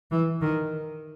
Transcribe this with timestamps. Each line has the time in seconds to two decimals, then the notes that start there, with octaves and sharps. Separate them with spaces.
0.11 E3
0.41 D#3